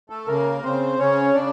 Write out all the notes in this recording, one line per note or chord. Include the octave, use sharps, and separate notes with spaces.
A3 A4
C#3 A#3 A#4
C#3 C4 C5
C#3 C#4 C#5
C#3 D4 D5